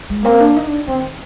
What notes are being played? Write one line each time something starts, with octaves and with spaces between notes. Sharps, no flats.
G#3
A#3 C4
D4
D#4
D4
D#3 C4